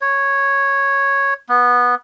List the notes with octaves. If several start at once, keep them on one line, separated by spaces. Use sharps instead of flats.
C#5
B3